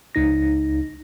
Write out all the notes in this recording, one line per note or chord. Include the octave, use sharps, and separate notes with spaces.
C#2 D#4 A#6